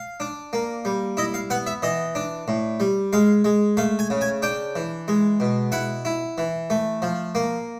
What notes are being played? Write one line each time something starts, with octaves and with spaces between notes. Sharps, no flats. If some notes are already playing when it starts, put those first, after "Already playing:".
Already playing: F5
D4
A#3
G3
E4 D#5
F5
B3 F#5
E5
E3 D#5
D4
A2
G3
G#3 F5
G#3
A3 F5
G#5
C#3
G#5
D4 G5
E3
G#3
B2
E4 F#5
E4
E3
A3
F3
A#3